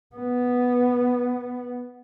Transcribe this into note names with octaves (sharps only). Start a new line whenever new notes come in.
B3